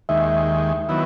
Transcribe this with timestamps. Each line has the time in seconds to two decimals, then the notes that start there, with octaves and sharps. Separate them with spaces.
0.09 D#2 D#3 G#3 E5
0.89 D#3 F#3 B3 E4